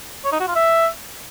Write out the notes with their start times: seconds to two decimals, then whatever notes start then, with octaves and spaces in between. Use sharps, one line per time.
0.25 C#5
0.32 D#4
0.40 F#4
0.48 F4
0.55 E5